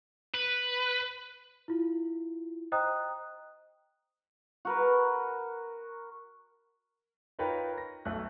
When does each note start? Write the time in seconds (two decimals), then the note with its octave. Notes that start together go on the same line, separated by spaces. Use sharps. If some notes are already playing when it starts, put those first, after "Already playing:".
0.34 B4
1.68 E4 F4
2.72 C5 D#5 G5 A#5 D#6 F#6
4.65 F#4 A#4 B4
7.39 D#4 F4 A#4 B4 C#5 G5
7.78 A#6
8.05 B1 A3 F#6